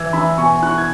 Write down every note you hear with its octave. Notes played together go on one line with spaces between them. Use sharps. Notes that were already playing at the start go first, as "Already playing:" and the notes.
Already playing: E3 E6 G#6
E3 B5 E6
B2 G#5 C#6
E4 C#6 F#6
G#6